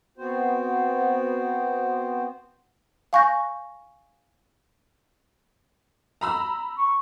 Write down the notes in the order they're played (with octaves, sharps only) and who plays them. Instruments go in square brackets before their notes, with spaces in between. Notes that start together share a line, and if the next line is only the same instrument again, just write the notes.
[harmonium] B3 C4 F#4 C5
[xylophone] F5 G#5 C#6 F#6 G6 A#6
[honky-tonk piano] A#5 B5 E6
[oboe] C#6